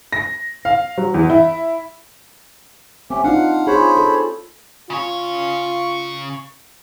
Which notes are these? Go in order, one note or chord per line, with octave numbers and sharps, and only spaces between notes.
A#6
F5
F#3
E2
E4
A3 C4 C#4 G4
D4 D#4 F4 F5 F#5
F4 G#4 C5 C#5 B5
A4
C#3 F4 C#5